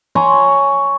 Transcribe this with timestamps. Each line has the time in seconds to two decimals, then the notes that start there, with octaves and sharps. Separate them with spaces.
0.15 C#5 G#5 A#5 C6